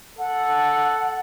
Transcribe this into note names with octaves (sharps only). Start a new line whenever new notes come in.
A4 F#5